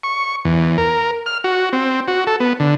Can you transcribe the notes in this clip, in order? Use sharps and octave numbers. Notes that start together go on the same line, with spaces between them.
C#6
E2
A#4
F6
F#4
C4
F#4
A4
B3
D3